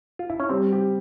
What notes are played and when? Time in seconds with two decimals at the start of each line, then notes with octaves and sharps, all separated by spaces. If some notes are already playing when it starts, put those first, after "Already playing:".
0.19 F4
0.30 E4
0.40 C#4
0.49 G3 C4
0.72 G4